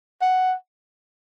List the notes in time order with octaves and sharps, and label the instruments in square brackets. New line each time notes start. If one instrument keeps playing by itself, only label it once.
[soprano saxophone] F#5